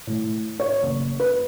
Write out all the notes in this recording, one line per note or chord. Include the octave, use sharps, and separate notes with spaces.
A2
C#5
F#1
B4